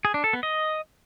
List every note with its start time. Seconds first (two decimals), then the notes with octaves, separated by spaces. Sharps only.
0.05 G#4
0.14 D4
0.24 A4
0.33 B3
0.43 D#5